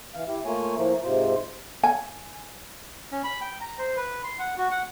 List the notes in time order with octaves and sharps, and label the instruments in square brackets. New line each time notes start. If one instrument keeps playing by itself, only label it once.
[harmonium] E3 F5
E4 G4
A3 A#3 F4 C#5 G#5
A2 F3 A3 A#3
G#2 C3 F4 C5
[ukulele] G#5
[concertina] C#4
B5
G5
A#5
C5
B4
C6
F#5
F#4
F#5